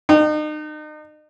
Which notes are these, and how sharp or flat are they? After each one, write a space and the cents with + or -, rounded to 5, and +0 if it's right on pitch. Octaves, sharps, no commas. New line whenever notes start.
D#4 -35 G5 -5